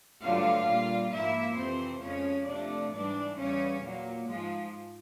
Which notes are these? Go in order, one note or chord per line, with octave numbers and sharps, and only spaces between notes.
G2 D3 F#3 A3 F4 F5
A#2 G3 A#3
G#2 F3 A#3 E4 E5
F2 C3 E3 C4 C5
F2 C#3 F3 G#3 C#4 C#5
C3 F3 A3 D4 D5
G#2 E3 G3 D4 D5
E2 C#3 E3 G3 C#4 C#5
A#2 F#3 A#3
G#2 F3 G#3